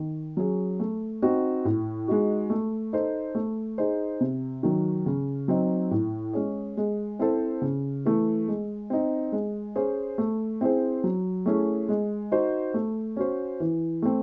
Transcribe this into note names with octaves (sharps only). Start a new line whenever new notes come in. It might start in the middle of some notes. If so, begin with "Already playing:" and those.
Already playing: D#3
F#3 C#4 G#4
A3
C4 D#4 F#4
A2
G#3 D#4 F#4
A3
D#4 A4 C5
A3
D#4 G#4 C5
C3
D#3 F#3
C#3
F#3 C4 D#4
A2
G#3 C#4 G#4
G#3
C4 E4 A4 C5
C#3
E3 A3
G#3
C4 D#4
G#3
C#4 G#4 C5
A3
C4 E4 G#4 C5
F#3
A3 C#4 E4 G#4
G#3
D#4 F#4 C5
A3
C#4 F#4 C5
E3
A3 C4